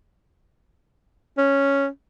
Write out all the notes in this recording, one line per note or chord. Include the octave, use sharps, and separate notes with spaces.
C#4